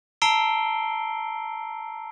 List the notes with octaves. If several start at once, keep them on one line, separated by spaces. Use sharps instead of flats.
A5 A#5 E6 C7 D7 G7